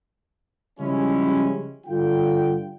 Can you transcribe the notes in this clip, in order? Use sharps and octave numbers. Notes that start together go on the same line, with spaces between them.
C#3 F3 G3 G#3 C#4 E4
G2 D3 F4 G5